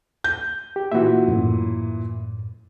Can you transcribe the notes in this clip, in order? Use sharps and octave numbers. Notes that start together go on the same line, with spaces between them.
G6
G4
A#2 E3 F#4 E5
F#2 A2